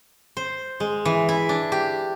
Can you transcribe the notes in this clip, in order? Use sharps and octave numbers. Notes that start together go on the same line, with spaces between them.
C5
G#3
E3
E4
D4
G4